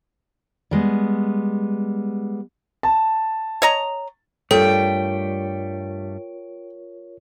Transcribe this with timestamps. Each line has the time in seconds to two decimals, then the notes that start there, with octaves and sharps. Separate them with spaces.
0.71 G3 G#3 B3
2.83 A5
3.62 C#5 D#5 A#5
4.51 G2 G3 A3 F4 A4 A#4 C#5 G5